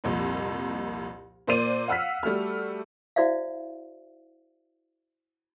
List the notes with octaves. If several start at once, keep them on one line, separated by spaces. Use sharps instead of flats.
C2 F2 A#2
A#2 A#3 C5 D5 D#7
F5 F#5 E6 F6 B6
G3 A3 F#4 F6
E4 F#4 C5 D5 E5 F5